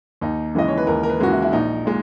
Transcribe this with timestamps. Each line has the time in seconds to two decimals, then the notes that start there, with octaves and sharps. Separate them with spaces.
0.21 D#2 D#4
0.55 C#3 E3 G#3 D#5
0.68 C#5
0.77 B4
0.87 D#2 A#4
1.03 A#4
1.09 B4
1.20 C#3 E3 G#3 F#4
1.31 E4
1.42 E4
1.53 A#1 D#4
1.85 A#2 G#3